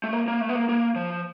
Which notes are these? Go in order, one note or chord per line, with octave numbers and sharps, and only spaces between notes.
A3
A#3
A#3
A3
B3
A#3
A#3
F3